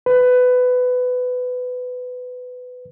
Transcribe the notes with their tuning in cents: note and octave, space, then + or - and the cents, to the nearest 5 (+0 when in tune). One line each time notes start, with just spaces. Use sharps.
B4 +20